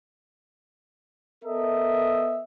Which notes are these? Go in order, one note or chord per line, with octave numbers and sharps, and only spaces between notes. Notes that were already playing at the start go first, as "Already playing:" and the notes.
B3 A4 A#4 D#5 E5